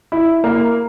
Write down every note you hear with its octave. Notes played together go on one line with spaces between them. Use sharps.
E4
A#3